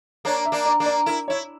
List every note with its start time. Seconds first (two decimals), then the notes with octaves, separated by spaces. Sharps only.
0.25 A#3 D4 C#5
0.46 E5
0.52 A#3 D4
0.66 D5
0.80 A#3 D4
0.86 D5
1.06 E4 A#4
1.28 E4 C#5